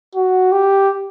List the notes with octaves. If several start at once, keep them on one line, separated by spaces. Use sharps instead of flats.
F#4
G4